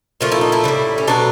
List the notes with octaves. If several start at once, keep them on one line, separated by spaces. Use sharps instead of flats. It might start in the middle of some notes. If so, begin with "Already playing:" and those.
A#2 F3 A3 F4
E4
D#4
E4
A2 E3 G3
C#4
B2 F#3 A3 D4